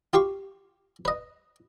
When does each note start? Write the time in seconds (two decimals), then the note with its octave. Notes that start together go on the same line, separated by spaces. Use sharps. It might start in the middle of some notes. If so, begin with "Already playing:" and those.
0.13 F4 G4 C6 C#6
1.05 B4 D#5